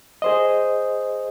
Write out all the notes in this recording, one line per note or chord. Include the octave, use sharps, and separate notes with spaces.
G#4 C5 D#5